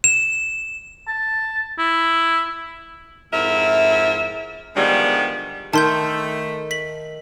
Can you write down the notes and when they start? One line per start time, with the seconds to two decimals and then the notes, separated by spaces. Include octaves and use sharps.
0.04 E7
1.08 A5
1.79 E4
3.33 F2 G#2 E4 A#4 E5
4.76 D3 D#3 F3 G3 G#3 B3
5.73 D#3 A3 D#4 A5 C6 G6
6.71 B6 F#7